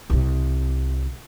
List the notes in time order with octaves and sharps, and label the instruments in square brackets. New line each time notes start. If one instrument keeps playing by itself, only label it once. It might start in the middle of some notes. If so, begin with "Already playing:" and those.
[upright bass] C2 C3